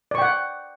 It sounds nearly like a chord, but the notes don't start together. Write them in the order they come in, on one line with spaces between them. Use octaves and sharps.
D5 C#6 G5 F#5